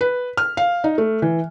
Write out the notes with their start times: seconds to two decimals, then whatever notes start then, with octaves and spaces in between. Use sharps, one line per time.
0.01 B4
0.37 F6
0.57 F5
0.84 D#4
0.98 A3
1.22 E3